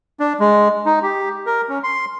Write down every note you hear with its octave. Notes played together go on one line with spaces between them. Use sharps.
D4
G#3
D#4
G4
A#4
C#4
C6